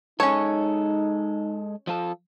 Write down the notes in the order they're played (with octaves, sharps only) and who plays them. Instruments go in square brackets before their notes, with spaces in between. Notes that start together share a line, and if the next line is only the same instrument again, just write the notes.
[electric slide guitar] G#3 A4 [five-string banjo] C#4 C#5 [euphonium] D#4
[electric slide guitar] F3 F4 A4